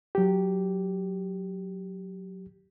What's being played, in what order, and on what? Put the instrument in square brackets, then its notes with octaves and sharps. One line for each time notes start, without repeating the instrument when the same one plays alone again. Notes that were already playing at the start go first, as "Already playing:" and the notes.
[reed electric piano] F#3 G4